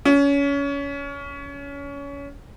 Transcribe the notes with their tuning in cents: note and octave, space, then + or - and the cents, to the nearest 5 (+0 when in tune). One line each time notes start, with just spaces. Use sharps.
C#4 +25